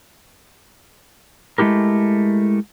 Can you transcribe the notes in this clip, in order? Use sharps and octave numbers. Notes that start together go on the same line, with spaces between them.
G#3 A3 E4 G4 A#4